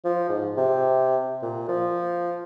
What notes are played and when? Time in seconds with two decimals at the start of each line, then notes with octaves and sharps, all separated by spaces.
0.05 F3
0.29 G#2
0.57 C3
1.42 A#2
1.69 F3